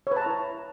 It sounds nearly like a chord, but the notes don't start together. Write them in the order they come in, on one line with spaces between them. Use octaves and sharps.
C#5 B4 A5 A#5 E4